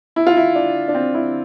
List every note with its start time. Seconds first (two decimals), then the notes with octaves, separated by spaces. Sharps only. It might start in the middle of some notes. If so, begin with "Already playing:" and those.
0.16 E4
0.27 F4
0.37 E4
0.55 D4
0.88 D4
0.95 C4
1.14 E4